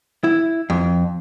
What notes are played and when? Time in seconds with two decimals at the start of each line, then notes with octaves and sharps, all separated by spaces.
0.24 E4
0.70 F2